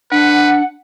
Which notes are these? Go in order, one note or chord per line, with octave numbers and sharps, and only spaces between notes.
D4 B4 F#5